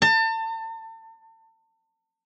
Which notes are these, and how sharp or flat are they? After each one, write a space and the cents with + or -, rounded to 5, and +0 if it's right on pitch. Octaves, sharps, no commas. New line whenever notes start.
A5 +35